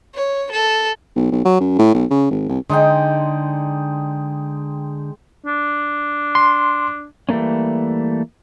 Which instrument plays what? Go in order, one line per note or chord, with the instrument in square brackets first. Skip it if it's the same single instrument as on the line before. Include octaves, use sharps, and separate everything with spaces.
[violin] C#5
A4
[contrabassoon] B1
B1
F#3
F#2
A2
B1
C#3
G#1
C2
[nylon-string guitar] D3 D4 [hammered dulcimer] G#3 D#4 G5
[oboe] D4
[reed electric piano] C6
[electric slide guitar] E3 G3 A3 A#3 C#4